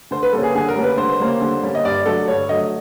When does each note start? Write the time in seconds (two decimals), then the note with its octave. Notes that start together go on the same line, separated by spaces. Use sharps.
0.11 D3 C5
0.23 B4
0.32 G3 A#3 C#4 A4
0.43 G#4
0.55 D3 G#4
0.69 A#4
0.76 G3 A#3 C#4
0.83 B4
0.98 D3 C5
1.20 G3 A#3 C#4
1.41 D3
1.63 G3 A#3 C#4
1.75 D#5
1.85 G2 D5
2.06 D3 F#3 A3 A4
2.28 G2 C#5
2.49 D3 F#3 A3 D#5